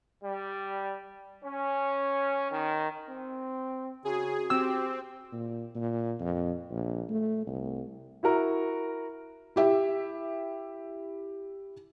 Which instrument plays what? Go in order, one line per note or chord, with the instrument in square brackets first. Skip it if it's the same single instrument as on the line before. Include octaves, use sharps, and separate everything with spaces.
[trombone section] G3
C#4
D#3
[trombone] C4
[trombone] C#3 [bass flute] F#4 [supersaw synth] G#4
[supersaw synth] C4 [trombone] G4 [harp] E6
[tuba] A#2
A#2
F2
A#1
A3
C2
[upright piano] E4 F#4 A#4 A#5
[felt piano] E4 G4 E5